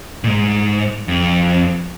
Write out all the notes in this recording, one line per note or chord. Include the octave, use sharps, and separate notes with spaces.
A#2
G#2
F2